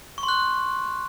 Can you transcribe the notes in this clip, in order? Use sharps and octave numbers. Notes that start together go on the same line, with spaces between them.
C#6
C6
F#6